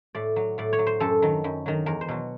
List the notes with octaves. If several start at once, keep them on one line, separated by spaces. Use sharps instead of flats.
A2 D5
F#3
A2 D5
C#5
F#3
C5
F#2 A4
D#3 F#3
F#2
D#3 F#3
E2 A#4
C5
B2 F#3